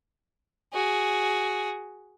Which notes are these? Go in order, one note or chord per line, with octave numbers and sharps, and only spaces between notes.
F#4 G#4